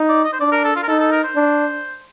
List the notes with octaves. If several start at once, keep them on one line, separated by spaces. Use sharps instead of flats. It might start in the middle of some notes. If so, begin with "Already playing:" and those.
Already playing: D#4
D5
D#5
C5
D4 D5
A#4
A4
F4
A#4
D#4 A4
A4
A#4
C5
D4